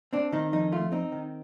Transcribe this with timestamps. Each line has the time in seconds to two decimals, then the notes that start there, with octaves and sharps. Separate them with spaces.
0.13 C4 D4
0.32 D#3 D#4
0.52 F2 D#4
0.72 A3 F4
0.92 C4 D#4
1.12 D#3